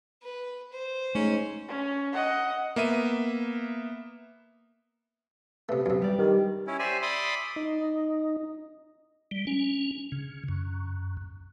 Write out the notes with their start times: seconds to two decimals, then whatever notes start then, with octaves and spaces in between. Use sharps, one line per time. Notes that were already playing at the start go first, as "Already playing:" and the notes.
0.22 B4
0.72 C5
1.15 G#2 A3 C#4
1.68 C#4
2.13 D#5 F#5
2.76 A#3 B3 E5 D#7
5.69 C3 A3 B3
5.86 F#2 C3
6.02 G3 D5
6.19 D#3 G4
6.67 C#4 E4
6.79 G4 C5 D5 E5 G#5
7.02 D5 E5 B5 C6 D6 D#6
7.56 D#4
9.31 G3
9.47 C#4
10.12 C#3
10.48 F#2